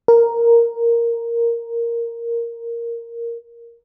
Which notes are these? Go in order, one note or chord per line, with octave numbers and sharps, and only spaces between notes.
A#4